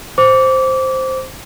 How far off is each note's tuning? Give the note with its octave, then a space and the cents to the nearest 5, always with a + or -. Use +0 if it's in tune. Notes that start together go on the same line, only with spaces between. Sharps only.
C5 +0 D6 -25